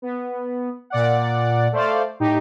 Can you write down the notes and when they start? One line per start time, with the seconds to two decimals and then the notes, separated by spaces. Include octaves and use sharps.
0.02 B3
0.90 A#2 D5 F#5
1.72 A3 C5 D5 F5
2.20 A2 D#4 G4